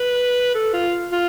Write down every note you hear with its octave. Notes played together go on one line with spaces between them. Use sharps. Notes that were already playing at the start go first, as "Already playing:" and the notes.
Already playing: B4
A4
F4
F4